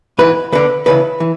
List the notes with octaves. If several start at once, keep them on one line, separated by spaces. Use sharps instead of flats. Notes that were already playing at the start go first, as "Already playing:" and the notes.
G#2 E3 B4
D2 D3 B4
D2 C#3 E3 B4
E3